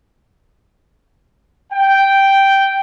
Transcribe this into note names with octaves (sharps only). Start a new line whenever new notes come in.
G5